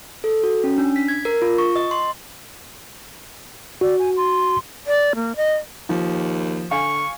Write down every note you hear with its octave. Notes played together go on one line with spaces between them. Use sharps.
A4
F#4
C#4
D4
B6
G#6
A#4
F4
C#6
D#5
C6
F#4 D5
G#5
C6
D5
A#3
D#5
D#2 F3
D3 F5 G#5 C#6